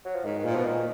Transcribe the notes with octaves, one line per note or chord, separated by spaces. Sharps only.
F#3
F3
G#2 D#3
D#3
A#2
B2 F3
A#2 D#3